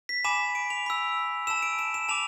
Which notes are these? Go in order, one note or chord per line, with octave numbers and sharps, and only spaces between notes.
B6
G#5 B5 D6 E7
D7
F7
B5 E6
A5 E6 E7
D7
E7
E7
A5 D6 F7